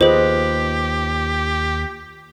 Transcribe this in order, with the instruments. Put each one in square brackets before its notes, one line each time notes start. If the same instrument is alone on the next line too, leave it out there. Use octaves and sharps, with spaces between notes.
[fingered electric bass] D#2 [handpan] F4 B4 D#5 [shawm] G4 [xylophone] G#4 C5